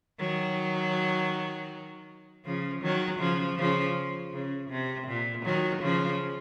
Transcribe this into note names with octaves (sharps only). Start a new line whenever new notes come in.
D#3 F#3
C#3 F3
D#3 F#3
C#3 F3
C#3 F3
C#3
C3
A#2
D#3 F#3
C#3 F3